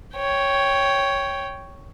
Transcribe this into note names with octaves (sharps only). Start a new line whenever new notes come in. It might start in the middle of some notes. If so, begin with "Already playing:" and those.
C#5 G5